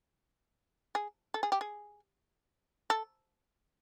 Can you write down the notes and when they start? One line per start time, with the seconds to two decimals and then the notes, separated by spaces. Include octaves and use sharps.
0.95 G#4
1.34 A4
1.43 G#4
1.52 G4
1.61 G#4
2.90 A4